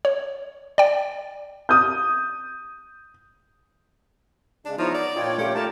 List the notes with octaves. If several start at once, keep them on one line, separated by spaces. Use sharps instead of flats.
C#5
D5 G5
D#6 G6
C#3 G#3 D4
F3 B3 D#4 E4 C#5 A#5
D5
A#2 D4 F4 C#5 D#5 G5
A3 C#4 F4 G4
A3 G4 A#4 D5 G5 A5 A#5